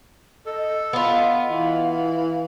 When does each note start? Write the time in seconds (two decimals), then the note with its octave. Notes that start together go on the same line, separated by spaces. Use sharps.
0.46 A4 D#5
0.93 B3 F4
1.50 E3 F5